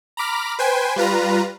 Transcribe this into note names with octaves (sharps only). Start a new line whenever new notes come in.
A#5 B5 D6 F6
B4 C5 G5 G#5
G3 F4 B4 A#5